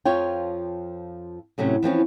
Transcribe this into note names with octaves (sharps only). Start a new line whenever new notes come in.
F2 F3 F4 C#5 G5
A2 C3 F#3 C#4
E3 F3 C4 C#4